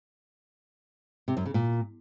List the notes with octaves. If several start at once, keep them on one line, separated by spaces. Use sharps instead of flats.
C3
F#2
C#3
A#2